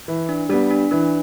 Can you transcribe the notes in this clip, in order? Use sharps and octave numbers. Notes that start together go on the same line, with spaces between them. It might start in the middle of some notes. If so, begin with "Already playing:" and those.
E3
D4
G3 B3 D4
D4
E3 D4